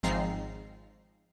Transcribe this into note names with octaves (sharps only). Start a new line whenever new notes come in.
G#1 G#2 F3 C4 A#5 C7